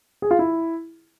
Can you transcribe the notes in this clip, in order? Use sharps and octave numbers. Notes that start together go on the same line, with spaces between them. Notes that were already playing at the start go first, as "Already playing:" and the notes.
G#4
F4
E4